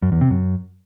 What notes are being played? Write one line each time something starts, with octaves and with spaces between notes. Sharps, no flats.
F#2
E2
C3
F#2